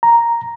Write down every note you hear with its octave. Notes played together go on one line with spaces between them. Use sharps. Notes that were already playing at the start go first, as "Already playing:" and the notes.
A#5